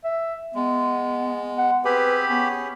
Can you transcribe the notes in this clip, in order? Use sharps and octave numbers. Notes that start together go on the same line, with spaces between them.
E5
G#3 B3
F#5
C4 G4 G#4 B4 B5
B3 C#4 G#4